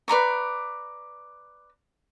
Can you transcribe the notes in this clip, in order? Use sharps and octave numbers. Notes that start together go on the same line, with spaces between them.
B4 D5 A#5 C#6